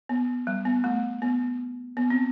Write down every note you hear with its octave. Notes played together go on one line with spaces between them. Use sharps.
B3
G3
B3
A3
B3
B3
C4